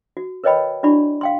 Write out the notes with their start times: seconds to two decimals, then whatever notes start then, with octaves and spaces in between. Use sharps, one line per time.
0.17 F#4
0.44 A#4 B4 C#5 D#5 G5 B5
0.83 D4 E4 F#4 D5 B5 C#6
1.21 F5 G5 C6